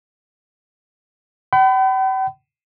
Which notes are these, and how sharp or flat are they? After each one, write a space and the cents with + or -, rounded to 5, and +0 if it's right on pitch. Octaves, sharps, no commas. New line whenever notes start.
G5 -45 B5 +30